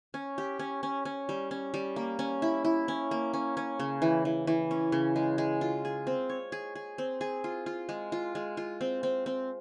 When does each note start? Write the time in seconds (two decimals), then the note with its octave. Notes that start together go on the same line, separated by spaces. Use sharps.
0.14 C#4
0.38 G4
0.59 C#4
0.83 C#4
1.05 C#4
1.29 G3
1.51 C#4
1.74 G3
1.96 A#3
2.19 C#4
2.42 E4
2.64 E4
2.88 C#4
3.11 A#3
3.34 C#4
3.57 C#4
3.80 C#3
4.02 E3
4.25 E3
4.47 E3
4.71 C#4
4.92 C#3
5.16 G#3
5.38 G#3
5.61 F4
5.85 G#4
6.07 C4
6.29 C#5
6.52 G#4
6.75 G#4
6.98 C4
7.21 G#4
7.44 F4
7.66 F4
7.89 G#3
8.12 F4
8.35 G#3
8.57 F4
8.81 C4
9.03 C4
9.26 C4